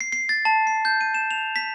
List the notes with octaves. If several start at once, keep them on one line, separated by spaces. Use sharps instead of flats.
C7
C7
A6
A5
C7
G6
D#7
E7
F7
B6